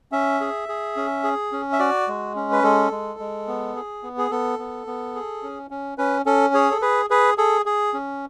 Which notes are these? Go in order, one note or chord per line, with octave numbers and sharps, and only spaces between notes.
C#4 E5
G#4
G#4
C#4
G#4
C#4
E5
F#4 D5
G#3
C#4
B4
G#3 A4
G#3
G#3
B3
G#4
B3
G#4
B3 A4
B3
B3
G#4
C#4
C#4
C#4 B4
C#4 A4
G#4 C#5
A4
G#4 B4
G#4 B4
G#4 A4
G#4
C#4